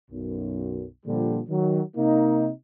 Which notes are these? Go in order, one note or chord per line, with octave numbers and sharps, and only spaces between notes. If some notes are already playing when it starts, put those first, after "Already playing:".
B1 F#2
A#2 D3 F3 G3
D#3 F#3
C3 A#3 D#4